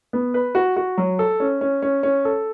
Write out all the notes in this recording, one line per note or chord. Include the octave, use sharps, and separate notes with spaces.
B3
B4
F#4
F#4
F#3
A4
C#4
C#4
C#4
C#4
A4